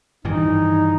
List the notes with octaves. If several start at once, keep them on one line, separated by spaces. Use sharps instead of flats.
G2 D#3 E3 D#4